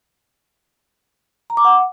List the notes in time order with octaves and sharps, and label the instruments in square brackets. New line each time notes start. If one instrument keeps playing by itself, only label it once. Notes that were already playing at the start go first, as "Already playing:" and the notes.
[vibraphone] A#5
D6
F#5